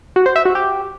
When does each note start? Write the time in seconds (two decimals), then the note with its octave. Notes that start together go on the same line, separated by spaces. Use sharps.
0.16 F#4
0.26 C5
0.36 E5
0.45 F#4
0.55 G4